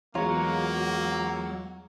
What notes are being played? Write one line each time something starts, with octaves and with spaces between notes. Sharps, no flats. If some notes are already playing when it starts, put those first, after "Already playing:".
E2 F#3 G#3 A#3 F4 C#5 A#5